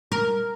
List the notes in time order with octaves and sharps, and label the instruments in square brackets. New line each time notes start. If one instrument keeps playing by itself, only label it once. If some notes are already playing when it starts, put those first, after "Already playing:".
[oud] A#4